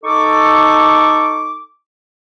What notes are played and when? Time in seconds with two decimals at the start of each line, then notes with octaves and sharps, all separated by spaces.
0.04 D#4 A4 C#6 D6